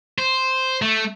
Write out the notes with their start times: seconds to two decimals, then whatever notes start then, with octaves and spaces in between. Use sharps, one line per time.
0.19 C5
0.82 A3